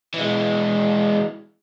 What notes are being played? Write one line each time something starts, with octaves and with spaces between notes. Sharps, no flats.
E3 G#3